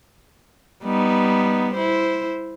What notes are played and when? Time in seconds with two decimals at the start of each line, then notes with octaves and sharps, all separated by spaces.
0.84 G3 B3 D#4
1.73 E4 C5